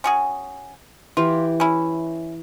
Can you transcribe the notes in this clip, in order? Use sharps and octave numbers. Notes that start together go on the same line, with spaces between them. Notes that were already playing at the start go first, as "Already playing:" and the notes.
C#4 F#4 G#4
E3 F4 G4
C#4 E4